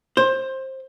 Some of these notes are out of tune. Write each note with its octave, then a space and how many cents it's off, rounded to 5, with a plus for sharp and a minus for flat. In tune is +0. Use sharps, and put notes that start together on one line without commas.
C5 +20